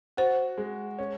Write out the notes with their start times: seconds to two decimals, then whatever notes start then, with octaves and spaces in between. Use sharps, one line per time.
0.17 F#4 C5
0.58 G#3
0.99 C#4